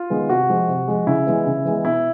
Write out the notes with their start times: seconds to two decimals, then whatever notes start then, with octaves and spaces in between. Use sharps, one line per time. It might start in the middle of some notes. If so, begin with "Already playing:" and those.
Already playing: F4
0.10 D#3 G#3 B3
0.29 C3 F#4
0.49 F3 G#3
0.68 C3
0.88 F3 G#3
1.07 C#3 E4
1.27 E3 G#3 B3
1.46 C#3
1.65 E3 G#3 B3
1.85 B2 E4